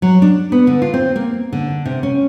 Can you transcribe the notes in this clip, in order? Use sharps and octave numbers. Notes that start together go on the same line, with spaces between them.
F#3
D4
B3
D3
F4
C4
A#3
D3
C3
C#4